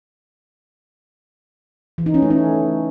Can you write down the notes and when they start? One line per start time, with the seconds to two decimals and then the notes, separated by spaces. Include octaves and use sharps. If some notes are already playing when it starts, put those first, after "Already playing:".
1.98 E3
2.06 D#4
2.14 C#4
2.22 A3
2.30 C#4